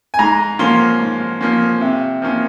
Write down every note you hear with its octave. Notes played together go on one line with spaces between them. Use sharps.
G#5
G#2 A#5
F3 A#3 C#4 C6
G#2
F3 A#3 C#4
C3
F3 A#3 C#4